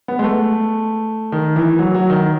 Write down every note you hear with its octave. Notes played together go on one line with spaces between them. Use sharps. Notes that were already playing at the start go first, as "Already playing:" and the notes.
B3
G#3
A3
D#3
E3
F#3
F#3
D#3